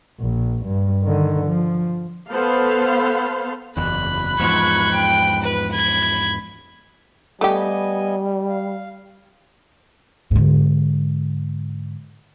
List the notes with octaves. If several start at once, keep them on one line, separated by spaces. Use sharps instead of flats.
A#1
G2
D3 D#3
F3
B3 A4 C5 F5
F#1 E2 B5 F#6
E2 G#2 F3 C#6 G#6
G5
B4
B5 G#6
G3 A3 B3 G4 D#5 G#5
F5
G#2 D3